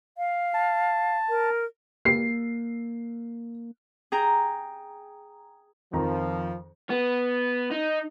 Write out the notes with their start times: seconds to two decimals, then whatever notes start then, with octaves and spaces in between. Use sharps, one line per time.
0.18 F5
0.54 A5
1.29 A#4
2.05 A#3 C7
4.12 G#4 G5 A#5
5.93 F2 D#3 F3 A#5
6.90 B3
7.71 D#4